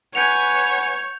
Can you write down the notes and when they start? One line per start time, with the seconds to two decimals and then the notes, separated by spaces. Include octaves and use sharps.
0.15 B4 C#5 F#5 G#5 G6 C#7 F7